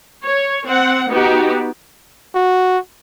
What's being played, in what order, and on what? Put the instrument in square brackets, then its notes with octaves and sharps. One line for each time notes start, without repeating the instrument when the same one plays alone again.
[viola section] C#5
C4 F#5
B3 D#4 F#4 G4
[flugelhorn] F#4